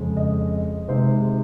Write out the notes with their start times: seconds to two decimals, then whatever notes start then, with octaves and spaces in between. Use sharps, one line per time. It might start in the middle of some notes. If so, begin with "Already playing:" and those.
Already playing: F2 C#3 G#3
0.17 D#5
0.88 C3 D#3 G#3 C5